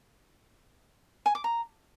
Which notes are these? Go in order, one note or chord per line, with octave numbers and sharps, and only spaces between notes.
G#5
D6
A#5